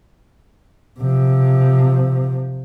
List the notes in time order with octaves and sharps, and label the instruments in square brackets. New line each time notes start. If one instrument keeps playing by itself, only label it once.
[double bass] C3 F3